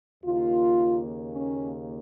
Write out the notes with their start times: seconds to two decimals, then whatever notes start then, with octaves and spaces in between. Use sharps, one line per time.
0.24 D#2 C#3 A#3 F4
1.33 C#4